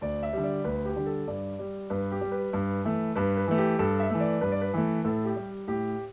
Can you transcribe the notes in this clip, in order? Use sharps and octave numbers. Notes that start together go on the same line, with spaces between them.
D2 D5
E5
D3 G3
D5
D2 B4
G4
D3 G3
A4
G2 D5
G3
G2 B4
G4
G3
B4
G2
E3 A3
G2 B4
B4
E3 A3
G4
G2 A4
E5
E3 A3
D5
G2 B4
D5
B4
E3 A3
A2 A4
G4
G3
A2 G4